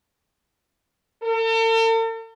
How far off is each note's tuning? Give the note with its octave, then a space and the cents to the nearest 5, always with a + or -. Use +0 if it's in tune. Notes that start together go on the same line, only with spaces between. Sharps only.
A4 +45